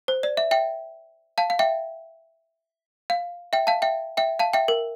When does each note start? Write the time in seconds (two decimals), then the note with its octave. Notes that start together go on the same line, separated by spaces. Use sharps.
0.08 C5
0.23 D5
0.37 E5
0.51 E5 G5
1.38 F5 A5
1.50 F5
1.59 E5 G5
3.10 F5
3.53 E5 G5
3.67 F5 A5
3.82 E5 G5
4.17 E5 G5
4.39 F5 A5
4.53 E5 G5
4.68 A#4